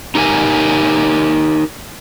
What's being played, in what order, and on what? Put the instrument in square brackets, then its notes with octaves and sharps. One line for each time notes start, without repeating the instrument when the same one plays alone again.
[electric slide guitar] D#4 G4 A#4 G#5